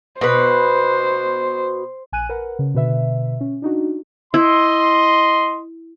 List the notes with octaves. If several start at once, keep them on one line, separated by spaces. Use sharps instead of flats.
B2 B4 C5
A#1 G#5 F#6 D#7
A#4 B4 F#5
C#3
B2 D3 B4 E5
C#4
D4 D#4 F#4
E4 D#5 C6